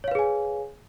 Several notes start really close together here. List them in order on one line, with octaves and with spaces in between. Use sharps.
C#5 F5 B4 G#4 G#5